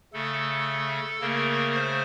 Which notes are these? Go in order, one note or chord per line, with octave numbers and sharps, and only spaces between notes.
C#3 A3 A4
C#3 A3 A#3 A#4
C5